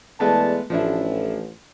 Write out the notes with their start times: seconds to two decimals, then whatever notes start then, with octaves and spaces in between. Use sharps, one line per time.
0.20 E2 G#3 A3 B3 D5 A5
0.70 A1 F3 D4 E4